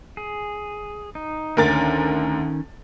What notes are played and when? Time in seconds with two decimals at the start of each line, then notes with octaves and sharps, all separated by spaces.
0.17 G#4
1.15 D#4
1.57 D2 D#3 C#4 A#4 A6